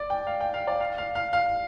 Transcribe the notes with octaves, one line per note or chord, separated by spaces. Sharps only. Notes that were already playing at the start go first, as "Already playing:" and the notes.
Already playing: D5
G5
F5
G5
F5
D5
F5
F5
F5
F5